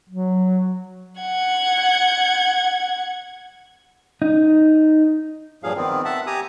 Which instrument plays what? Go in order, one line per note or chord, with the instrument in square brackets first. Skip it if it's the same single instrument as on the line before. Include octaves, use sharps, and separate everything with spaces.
[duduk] F#3
[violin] F#5 G#6
[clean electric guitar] D#4
[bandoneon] G2 A#2 F3 F#3 G#4 F5
D#3 B3 C4
E5 F#5 A5
G4 G#5 A#5 D#6